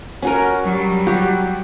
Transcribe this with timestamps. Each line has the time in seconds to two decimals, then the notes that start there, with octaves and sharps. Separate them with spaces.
0.22 C#4 F#4 A#4
0.64 F#3 G3
1.07 F#4 G4